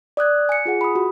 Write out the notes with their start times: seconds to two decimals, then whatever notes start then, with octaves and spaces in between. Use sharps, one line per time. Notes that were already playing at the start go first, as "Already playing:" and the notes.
0.17 D5 D#6 F#6 G#6
0.49 G#5 C#7
0.66 F4 G#4 F#5
0.81 B5 D#6
0.95 F#4